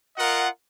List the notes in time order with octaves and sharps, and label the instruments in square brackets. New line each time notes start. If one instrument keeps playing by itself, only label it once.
[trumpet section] F4 A#4 D#5 F#5